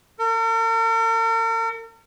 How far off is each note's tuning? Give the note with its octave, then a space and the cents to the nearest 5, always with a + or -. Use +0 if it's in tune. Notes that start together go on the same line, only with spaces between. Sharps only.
A#4 -45